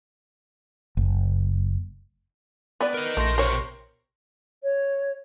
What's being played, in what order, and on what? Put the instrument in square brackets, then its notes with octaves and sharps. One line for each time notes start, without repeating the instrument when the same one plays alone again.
[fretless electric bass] F#1
[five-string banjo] B3 B4 D5
[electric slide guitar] A#4 D#5
[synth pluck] A#1 C6 A#6 [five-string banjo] A3
[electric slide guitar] B2 G4 C5 [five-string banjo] A#4 C#5
[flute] C#5